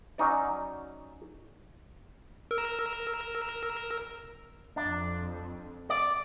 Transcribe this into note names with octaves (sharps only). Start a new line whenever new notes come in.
F#3 C#4 D#4 D5
A#4 E6
F2 D4
D5